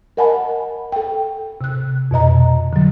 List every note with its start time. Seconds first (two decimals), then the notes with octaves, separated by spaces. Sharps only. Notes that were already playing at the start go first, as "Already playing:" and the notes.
0.17 A#4 D#5 F#5 G#5 A5 B5
0.92 A4 G5
1.61 C3 F#6
2.11 F2 B2 D#5 A#5
2.73 D3 F#3